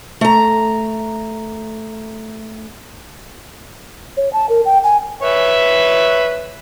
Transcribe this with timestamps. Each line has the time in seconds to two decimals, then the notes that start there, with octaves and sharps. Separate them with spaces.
0.21 A3 A#5
4.17 C#5
4.33 A5
4.49 A#4
4.65 G5
4.84 G#5
5.22 B4 C#5 E5